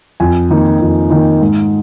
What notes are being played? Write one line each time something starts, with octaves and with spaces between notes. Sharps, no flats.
F2 G#5
D#3 A#3 D#4
F2
D#3 A#3 D#4
G#2